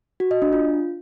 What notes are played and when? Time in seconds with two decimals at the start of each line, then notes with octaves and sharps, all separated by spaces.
0.20 F#4
0.31 D#5
0.42 D4
0.53 F4